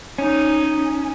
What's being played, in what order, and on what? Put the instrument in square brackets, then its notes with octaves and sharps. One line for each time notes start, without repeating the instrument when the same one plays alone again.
[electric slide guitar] C#4 [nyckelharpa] D#4